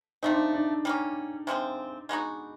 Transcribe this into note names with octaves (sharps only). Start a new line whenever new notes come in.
F3 A3 C4 D#4
D4
D4
G3 A#3 C#4
C3 F3 G#3 C4
G#3 B3 D#4 F#4